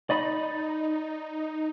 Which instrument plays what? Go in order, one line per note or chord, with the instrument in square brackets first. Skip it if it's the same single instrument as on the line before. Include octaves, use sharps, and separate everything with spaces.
[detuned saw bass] D#4 [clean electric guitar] D5 D#5 B5